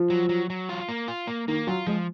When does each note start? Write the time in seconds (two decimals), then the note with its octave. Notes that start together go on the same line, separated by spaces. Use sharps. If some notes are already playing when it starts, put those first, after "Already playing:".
Already playing: F3
0.10 F#3
0.29 F#3
0.50 F#3
0.69 F4
0.89 A#3
1.08 F4
1.27 A#3
1.48 D#3 A#3
1.67 F#3 F4
1.87 F3 G#3